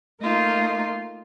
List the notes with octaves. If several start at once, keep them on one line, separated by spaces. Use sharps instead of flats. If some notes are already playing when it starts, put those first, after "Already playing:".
A3 A#3 D#4 F4